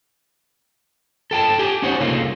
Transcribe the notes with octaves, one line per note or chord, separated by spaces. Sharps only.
A4 G5 A5
G4 G#5
C#4 D#4 F#4 C5 C#5
C2 C#3 A3 A#3 F4